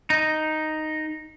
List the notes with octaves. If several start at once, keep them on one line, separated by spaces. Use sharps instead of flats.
D#4